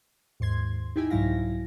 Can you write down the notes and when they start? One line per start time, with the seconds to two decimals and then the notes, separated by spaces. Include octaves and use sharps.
0.40 D#2 G#2 C6 G#6
0.96 D#4 E4 G4 E5 G#5
1.10 C2 G#2 F#3 E4 F5 A#6